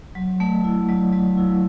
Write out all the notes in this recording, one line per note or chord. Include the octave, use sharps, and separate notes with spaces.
F#3
A3
E4
F#3
F#3
E4